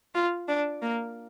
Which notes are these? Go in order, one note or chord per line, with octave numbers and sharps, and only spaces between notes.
F4
D4
A#3